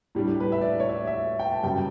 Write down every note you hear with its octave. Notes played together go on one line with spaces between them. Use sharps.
A2 G3 D4 G4
G4
B4
E5
D5
C#5
E5
E5
G5
A5
F#2 C#3 G3 G5